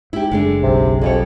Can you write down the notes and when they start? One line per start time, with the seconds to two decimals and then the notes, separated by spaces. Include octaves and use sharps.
0.13 G#2 E4 G4
0.31 F#1 G#3 A3 D4
0.63 B1 C3
1.02 F2 E3 G3 C#5